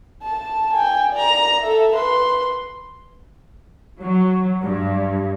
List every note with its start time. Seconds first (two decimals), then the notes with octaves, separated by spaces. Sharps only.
0.23 A5
0.73 G5 G#5
1.13 D5 A#5
1.61 A4 E5
1.96 B4 C6
4.00 F#3
4.62 G2